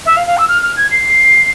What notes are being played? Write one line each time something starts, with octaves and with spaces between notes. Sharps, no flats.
E5
F5
F5
E6
F6
F6
G#6
C7